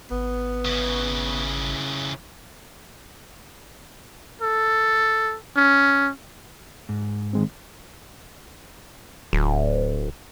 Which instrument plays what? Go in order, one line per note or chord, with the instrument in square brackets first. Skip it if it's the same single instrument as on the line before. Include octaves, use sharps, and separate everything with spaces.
[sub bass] G#1 [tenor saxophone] B3
[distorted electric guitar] C#3 E3
[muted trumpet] A4
C#4
[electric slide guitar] G#2
[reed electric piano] D#3 G#3 C4
[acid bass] D1